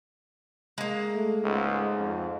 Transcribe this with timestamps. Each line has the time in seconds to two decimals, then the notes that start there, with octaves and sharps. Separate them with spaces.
0.78 G#3 A#3
1.14 A3
1.44 C#2 G#2
1.99 F2